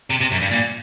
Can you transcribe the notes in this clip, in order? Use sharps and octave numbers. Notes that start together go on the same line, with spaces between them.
C3
C3
F#2
G2
A#2